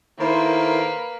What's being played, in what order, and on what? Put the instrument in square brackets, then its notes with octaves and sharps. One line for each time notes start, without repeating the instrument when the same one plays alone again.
[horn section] D#3 A4 C5 [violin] A#3 B4 [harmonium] E4